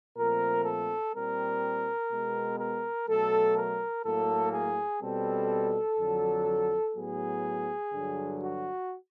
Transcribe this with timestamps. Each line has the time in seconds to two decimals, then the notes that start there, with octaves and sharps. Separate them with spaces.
0.17 A#2 F3 A3 C4 A#4
0.65 A4
1.13 A#2 G3 C4 A#4
2.10 B2 G#3 B3
2.59 A#4
3.08 B2 F#3 A3 A4
3.56 A#4
4.05 A2 F#3 A#3 A4
4.53 G#4
5.02 B2 G3 C4 A4
5.99 F2 D3 F#3
6.96 A2 F#3 B3 G#4
7.93 G2 D3 F#3
8.42 F#4